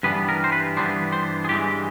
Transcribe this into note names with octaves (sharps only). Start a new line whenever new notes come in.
G2 E3 G3 B3 D4 B4
A#4
C5
B4
G2 E3 G3 B3 D4 C5
C5
G#4
G2 E3 G#3 G4